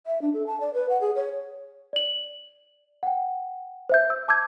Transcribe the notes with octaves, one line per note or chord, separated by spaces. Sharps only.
E5
D4
A4
A5
D5
B4
F#5
G#4
C#5
D5 F#7
F#5 G5
C5 E5 G6
E6
A5 D6 E6 G6 G#6